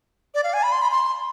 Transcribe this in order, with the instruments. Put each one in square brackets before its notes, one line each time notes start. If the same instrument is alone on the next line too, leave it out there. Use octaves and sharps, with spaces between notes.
[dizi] D5
F5
G#5
B5
C6
B5
C6